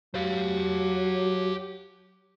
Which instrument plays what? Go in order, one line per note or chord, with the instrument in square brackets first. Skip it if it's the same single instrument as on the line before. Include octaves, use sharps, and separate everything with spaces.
[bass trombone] F#3 [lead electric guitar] G4 F5